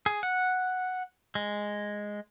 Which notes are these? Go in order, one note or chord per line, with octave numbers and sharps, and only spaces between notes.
G#4
F#5
G#3